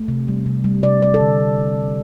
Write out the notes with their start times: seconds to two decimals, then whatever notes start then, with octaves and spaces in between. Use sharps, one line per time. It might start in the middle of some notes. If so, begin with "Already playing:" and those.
Already playing: A3
0.08 C3
0.28 G3
0.46 C3
0.64 G3
0.83 C3 D5
1.02 G3 D5
1.14 A4
1.21 D3